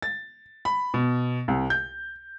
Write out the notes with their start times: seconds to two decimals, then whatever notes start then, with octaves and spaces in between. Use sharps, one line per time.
0.02 A6
0.65 B5
0.94 B2
1.48 C2
1.70 G6